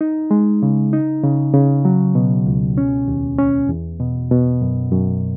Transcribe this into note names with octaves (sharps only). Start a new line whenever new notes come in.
D#4
G#3
C#3
D#4
C#3
C#3
F#3
B2
C#2
C#4
D#2
C#4
E2
B2
B2
F#2
F#2